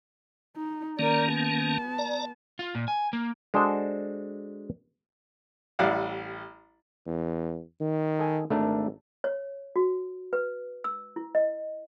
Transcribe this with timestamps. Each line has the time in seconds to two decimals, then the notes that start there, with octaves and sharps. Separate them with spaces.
0.56 D#4
0.99 D#3 A#3 C#4 A#4 D5
1.32 B3 A5
1.98 D5 A#5
2.59 F4
2.75 A#2
2.88 G#5
3.13 A#3
3.54 G#3 D4 F#4 A4 C5
5.79 A1 G3 E4 D5 F5 F#5
7.06 E2
7.80 D#3
8.19 A4 D#5 G#5
8.50 G#1 A3 D4 A#4
9.24 C#5
9.76 F#4
10.33 B4
10.84 E6
11.16 E4
11.35 D#5